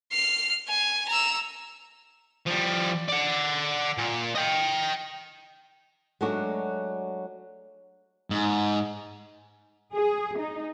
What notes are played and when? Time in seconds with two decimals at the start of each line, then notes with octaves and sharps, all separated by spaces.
0.12 F6 C7
0.69 G#5
1.09 A#5 E6
2.46 F3 G3
3.08 D5 F#5
3.98 A#2
4.35 D#5 G5
6.21 F#3 G#3 A3 D4 F#4
8.30 G#2
9.93 G#4
10.39 D#4